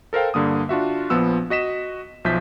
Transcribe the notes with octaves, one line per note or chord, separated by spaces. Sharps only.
A4 A#4 C5 F5 G5
G2 D3 A#3 D#6
D4 F4 F#4 E5
A#1 F3 B3 E6
F#4 D#5 B6 E7
B1 F3 E5 G6 B6